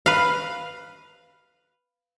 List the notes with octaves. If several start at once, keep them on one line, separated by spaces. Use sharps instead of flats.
B4 F5